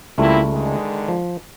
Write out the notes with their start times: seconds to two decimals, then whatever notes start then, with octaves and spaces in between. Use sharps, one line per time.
0.18 C#2 G3 A3 A#3 C4 E4
0.52 D3 D#3 G#3
1.08 F3